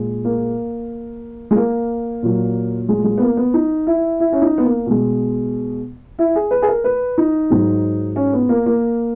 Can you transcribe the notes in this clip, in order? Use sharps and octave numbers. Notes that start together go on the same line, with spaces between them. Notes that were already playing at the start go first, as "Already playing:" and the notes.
Already playing: A#2 G#3
A#3
G#3
A#3
A#2 F#3
G#3
G#3
B3
A#3
B3
D#4
E4
E4
C#4
D#4
B3
A#3
B2 G#3
E4
G#4
B4
G#4
A#4
B4
D#4
G#2 F#3
C#4
B3
A#3
A#3